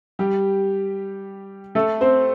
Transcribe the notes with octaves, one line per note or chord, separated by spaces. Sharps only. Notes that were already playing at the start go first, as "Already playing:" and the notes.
G3 G4
A3 A4
C4 C5